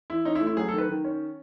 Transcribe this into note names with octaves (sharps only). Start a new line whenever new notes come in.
E3 E4
C#4 D#4
E4
A3
E4
F#3 G#4
A4
D#3 B4
D#3
C#4